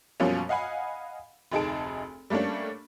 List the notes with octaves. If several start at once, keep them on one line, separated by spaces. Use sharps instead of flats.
F#2 B2 F3 G3 A#3 C#4
D#5 F5 F#5 G#5 B5
F1 D2 D#4 G#4 A5 D7
G3 A3 A#3 C#4 D4